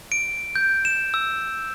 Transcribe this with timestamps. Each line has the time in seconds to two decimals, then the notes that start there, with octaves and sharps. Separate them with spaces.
0.12 D7
0.56 G6
0.85 E7
1.14 E6